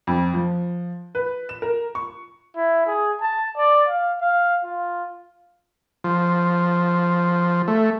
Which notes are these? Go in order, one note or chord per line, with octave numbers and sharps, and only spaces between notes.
F2
F3
B4
E7
A#4
C#6
E4
G#4
A5
D5
F5
F5
F4
F3
A3